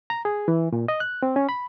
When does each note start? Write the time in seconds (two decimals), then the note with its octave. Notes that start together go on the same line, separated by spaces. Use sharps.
0.10 A#5
0.25 G#4
0.48 E3
0.73 A#2
0.88 D#5
1.00 F#6
1.23 C4
1.36 C#4
1.49 B5